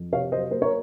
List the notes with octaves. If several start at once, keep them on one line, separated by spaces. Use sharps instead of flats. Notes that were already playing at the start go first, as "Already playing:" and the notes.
Already playing: F2
C3 C#5 F5
F#3 C5 D#5
A#3 C5
A#4 C#5